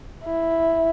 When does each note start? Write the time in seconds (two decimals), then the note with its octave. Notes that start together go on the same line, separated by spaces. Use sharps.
0.24 E4